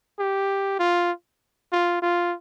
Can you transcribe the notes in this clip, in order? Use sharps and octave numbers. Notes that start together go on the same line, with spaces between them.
G4
F4
F4
F4